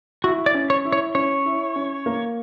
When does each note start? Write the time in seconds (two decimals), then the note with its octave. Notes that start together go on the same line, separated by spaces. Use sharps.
0.24 E4 F#4
0.46 D5
0.54 C#4
0.70 C#5
0.85 E4
0.92 C#5
1.15 C#4 C#5
1.46 E4
1.76 C#4
2.06 A#3